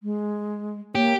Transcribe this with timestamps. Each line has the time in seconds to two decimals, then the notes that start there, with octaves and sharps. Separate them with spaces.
0.03 G#3
0.95 A#3 G4 C#5